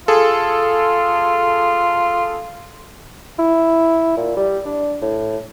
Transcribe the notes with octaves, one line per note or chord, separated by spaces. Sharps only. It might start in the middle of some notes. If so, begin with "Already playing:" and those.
F4 G#4 A4
E4
A#2
G3
D4
A2